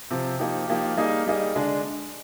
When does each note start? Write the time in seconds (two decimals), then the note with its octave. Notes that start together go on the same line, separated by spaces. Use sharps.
0.11 C3 F3 C4
0.39 F3 A#3 D#4 G4
0.68 F3 A#3 D#4 G4
0.97 G3 A#3 D#4 G#4 D#5
1.27 G3 A#3 D#4 G#4 D#5
1.55 D3 G#3 D4 G#4 D#5